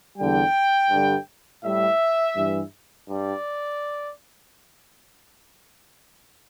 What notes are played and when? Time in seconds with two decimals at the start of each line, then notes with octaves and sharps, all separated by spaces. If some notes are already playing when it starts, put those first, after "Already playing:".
0.17 E2 D3 G3 G5
0.90 G2 D3 G3
1.63 A2 G3 E5
2.36 G2 E3 G3
3.08 G2 G3 D5